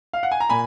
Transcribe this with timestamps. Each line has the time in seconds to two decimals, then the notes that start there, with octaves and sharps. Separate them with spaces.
0.13 F5
0.23 F#5
0.31 G#5
0.40 A#5
0.49 A#2 G#5 B5